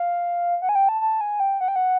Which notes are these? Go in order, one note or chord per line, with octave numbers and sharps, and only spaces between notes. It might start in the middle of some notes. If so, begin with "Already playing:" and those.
Already playing: F5
F#5
G#5
G5
A5
A5
G#5
G5
F#5
G5
F#5